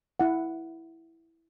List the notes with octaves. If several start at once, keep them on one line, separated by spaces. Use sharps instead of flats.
E4 F#5